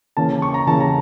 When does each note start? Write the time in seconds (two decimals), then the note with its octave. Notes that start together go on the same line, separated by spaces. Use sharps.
0.17 C#3 E3 A#3 C#4 A5
0.42 C#6
0.54 A#5
0.66 C#3 E3 A#3 C#4 A5
0.80 A#5